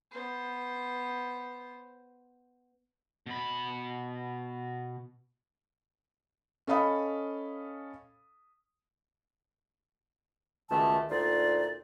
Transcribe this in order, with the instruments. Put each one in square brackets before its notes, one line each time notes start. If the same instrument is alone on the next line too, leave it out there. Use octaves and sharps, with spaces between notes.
[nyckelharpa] B3 C5
[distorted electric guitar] B2 B5
[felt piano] C#4 A4 D#5 F5 B5 D#6
[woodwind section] C#2 B2 D#3 A3 A5
D2 A#2 D#4 F4 D5